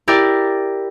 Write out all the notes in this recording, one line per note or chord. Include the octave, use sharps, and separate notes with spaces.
E4 G4 A#4 D5